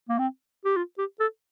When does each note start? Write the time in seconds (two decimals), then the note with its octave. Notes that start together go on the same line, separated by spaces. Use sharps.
0.09 A#3
0.19 C4
0.65 G4
0.77 F4
0.98 G4
1.20 A4